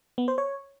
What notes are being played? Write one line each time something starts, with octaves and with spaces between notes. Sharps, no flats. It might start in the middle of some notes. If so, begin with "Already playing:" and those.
B3
C5
C#5